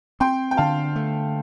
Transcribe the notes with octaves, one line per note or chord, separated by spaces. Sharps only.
C4 G5 C6
G5
D3 F5 A5
A3